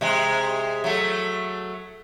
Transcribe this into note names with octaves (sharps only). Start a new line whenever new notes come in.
C3 G#3
F#3 A3